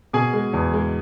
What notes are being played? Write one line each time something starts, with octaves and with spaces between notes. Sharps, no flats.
B2 G#4 G#5
G#3
E2
G#3